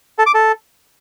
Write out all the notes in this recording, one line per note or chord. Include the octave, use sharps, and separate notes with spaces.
A4
D6
A4